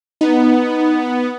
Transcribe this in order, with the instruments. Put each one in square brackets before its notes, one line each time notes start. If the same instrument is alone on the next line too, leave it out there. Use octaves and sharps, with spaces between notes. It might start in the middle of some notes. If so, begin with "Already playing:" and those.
[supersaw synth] B3 [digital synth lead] D#4